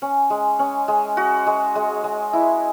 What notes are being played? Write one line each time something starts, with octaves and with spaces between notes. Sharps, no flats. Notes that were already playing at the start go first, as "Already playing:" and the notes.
C#4
G#3
C#4
G#3
F#4
G#3
G#3
G#3
E4